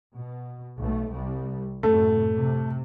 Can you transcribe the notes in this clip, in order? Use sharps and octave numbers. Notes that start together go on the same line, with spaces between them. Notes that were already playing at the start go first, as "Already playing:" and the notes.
B2
B1 A3
C2 G3
F#2 A2 C3 A3
C3